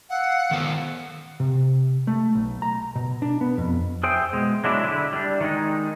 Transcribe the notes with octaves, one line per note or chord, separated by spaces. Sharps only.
F5 F#5 E6
D#3 B3 C5
C3
A3
B1
A#5
B2
D4
B3
F2
G#4 C5 E5 G5
B2 G#3
F#3 G#3 D4 E4
D3 E4
G3 D4
D#3 G#3 D#4